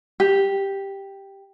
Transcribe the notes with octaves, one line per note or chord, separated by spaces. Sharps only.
G4